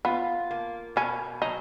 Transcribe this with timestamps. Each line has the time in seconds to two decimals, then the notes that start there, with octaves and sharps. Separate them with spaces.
0.05 B3 F4
0.51 A#3
0.96 B2 C#4
1.42 F#3 D#4